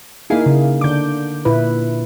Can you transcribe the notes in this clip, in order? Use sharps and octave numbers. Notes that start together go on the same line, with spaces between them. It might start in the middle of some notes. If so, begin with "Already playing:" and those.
A#3 D#4 E4 G#4 F5
C#3
D3 D4 D6 G6
A#2 E4 B4